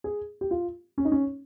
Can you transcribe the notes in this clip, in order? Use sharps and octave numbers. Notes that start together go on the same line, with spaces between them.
G#4
G4
F4
C#4
D#4
C#4